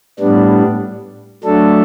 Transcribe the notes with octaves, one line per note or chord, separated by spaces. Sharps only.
A2 G3 B3 D4
F#3 A3 D4 A4